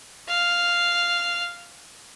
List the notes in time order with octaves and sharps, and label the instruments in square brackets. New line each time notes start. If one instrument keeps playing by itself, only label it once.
[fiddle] F5